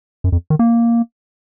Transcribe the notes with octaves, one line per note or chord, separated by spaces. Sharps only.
F#2
F2
D#3
A#3